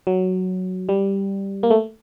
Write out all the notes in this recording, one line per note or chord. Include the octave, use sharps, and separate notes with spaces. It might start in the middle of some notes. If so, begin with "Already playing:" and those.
F#3
G3
A#3
A3